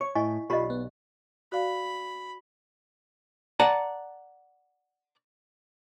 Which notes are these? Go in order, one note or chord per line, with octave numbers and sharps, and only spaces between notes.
C#5 C#6
A2 E4 D#5 G#5 C#6
B1 F4 G4 D5 D#5 B5
B3
F#4 D5 F5 B5
D5 F#5 A5 A#5